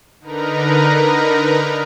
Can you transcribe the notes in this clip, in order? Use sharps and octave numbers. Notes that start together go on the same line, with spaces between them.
D3 D#4 A#4 B4 A#5